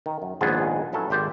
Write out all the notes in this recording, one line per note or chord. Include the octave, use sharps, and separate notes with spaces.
D#3
F#2
A#1 D#2 G#2 B3 G#4 A5
F#3 C#4 E4 A4 B4 C#5
G#1 G4 C5 D5